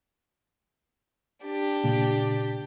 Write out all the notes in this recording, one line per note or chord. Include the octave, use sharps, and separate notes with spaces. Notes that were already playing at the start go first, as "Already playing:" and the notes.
D4 G4
A#2 C#3 A#3